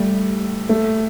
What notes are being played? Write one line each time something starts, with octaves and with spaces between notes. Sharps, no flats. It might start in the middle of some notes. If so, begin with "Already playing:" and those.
Already playing: G3 A3
A3